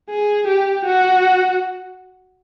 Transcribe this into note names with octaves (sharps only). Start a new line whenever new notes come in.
G#4
G4
F#4